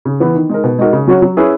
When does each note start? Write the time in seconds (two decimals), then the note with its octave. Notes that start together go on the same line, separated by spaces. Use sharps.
0.05 C#3
0.20 E3 B3
0.35 D#3
0.50 G#3 D#4 A#4
0.64 B2
0.79 G#3 D#4 F#4 A#4
0.93 C#3
1.08 F#3 C#4 F#4
1.22 F#3
1.37 C#4 E4 G#4 B4